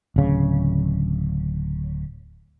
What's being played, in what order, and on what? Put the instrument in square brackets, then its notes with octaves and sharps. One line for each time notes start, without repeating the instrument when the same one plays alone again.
[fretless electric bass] D1 C#3